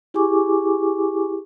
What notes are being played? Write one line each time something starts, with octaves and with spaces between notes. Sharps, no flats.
E4 G4 G#4 G#5 C#6 D6